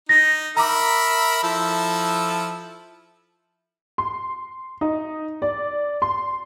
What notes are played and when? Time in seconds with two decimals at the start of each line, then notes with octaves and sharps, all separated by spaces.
0.09 D#4 A#6
0.57 A#4 E5 A#5 B5 D6
1.43 F3 E4 A4
3.98 C6
4.81 D#4
5.42 D5
6.02 C6